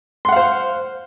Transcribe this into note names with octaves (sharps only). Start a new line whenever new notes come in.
C5 F5 F#5 C6